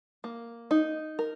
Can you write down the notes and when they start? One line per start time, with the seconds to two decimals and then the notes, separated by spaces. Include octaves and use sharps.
0.24 A#3
0.71 D#4
1.19 A#4